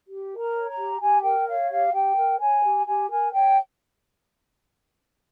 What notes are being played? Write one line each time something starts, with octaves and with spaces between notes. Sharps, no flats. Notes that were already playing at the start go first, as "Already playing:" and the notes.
G4
A#4
A#5
C#5
A#5
G4
G4 G#5
A#4 G5
C#5 F5
G4 F5
G4 G5
A#4
C#5 G#5
G4
G4 G#5
A#4 G#5
C#5 G5